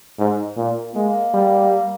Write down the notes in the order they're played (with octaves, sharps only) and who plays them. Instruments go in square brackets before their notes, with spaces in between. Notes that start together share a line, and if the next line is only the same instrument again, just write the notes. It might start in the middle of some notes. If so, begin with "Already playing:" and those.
[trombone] G#2
A#2
[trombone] G#3 [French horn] A#3
[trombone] G3